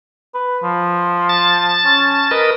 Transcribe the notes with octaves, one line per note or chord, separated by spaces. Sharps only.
B4
F3
A5 A6
C#4
A#4 B4 D#5